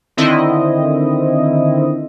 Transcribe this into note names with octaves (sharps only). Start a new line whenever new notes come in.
D3 D#3 C4 E4 D#5